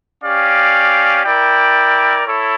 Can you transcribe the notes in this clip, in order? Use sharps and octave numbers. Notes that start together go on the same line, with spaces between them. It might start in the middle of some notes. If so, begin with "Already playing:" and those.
C#4 G4 D5 F5
E4 A#4 D5 G5
E4 A4 C#5